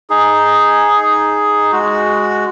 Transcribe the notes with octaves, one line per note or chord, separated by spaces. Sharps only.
D#4 G#4
G#3 F#4